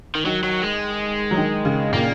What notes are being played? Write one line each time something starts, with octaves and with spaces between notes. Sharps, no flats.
D#3
D#3 F#3
F#3
G#3
F#3
D#3
C#3
A#2 A#3